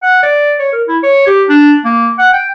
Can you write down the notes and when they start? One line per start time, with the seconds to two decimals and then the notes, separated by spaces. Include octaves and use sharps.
0.03 F#5
0.23 D5
0.59 C#5
0.72 A#4
0.88 E4
1.03 C#5
1.27 G4
1.49 D4
1.85 A#3
2.19 F#5
2.33 G5